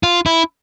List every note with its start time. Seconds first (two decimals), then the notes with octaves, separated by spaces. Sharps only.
0.03 F4
0.26 E4